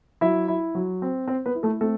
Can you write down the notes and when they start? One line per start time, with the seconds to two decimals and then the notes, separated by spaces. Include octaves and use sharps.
0.21 F#3 E4 E5
0.48 E4
0.75 F#3
1.02 C4
1.28 C4 C5
1.46 B3 B4
1.55 E4
1.63 A3 A4
1.81 A3 C4 A4